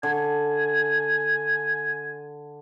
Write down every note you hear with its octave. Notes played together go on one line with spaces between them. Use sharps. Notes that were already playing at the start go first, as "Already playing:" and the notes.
D3 G#5